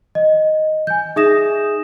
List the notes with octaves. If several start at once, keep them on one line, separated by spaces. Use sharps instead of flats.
D#5
G#5 G6
D#4 G#4 E5 D#6 A#6 E7